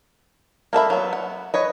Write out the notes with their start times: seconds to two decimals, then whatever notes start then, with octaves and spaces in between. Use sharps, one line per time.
0.73 A#3 A4 E5 B5
0.90 F#3 B3
1.13 F#5
1.54 B4 C#5 D#5